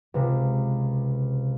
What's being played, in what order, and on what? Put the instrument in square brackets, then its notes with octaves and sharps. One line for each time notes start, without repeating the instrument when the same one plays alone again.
[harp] C#2 C3